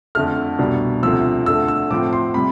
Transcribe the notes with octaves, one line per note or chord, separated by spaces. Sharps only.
F2 D3 A3 F6
C2 B2 G3 D4
D2 C3 F3 E6
D2 D3 A3 E6
E6
A2 F3 C4 D6
C6
C3 G3 B5